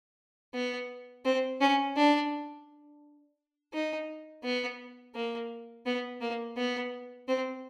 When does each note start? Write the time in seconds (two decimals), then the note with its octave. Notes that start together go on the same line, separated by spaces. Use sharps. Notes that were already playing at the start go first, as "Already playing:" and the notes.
0.54 B3
1.25 C4
1.60 C#4
1.96 D4
3.73 D#4
4.44 B3
5.15 A#3
5.86 B3
6.21 A#3
6.57 B3
7.28 C4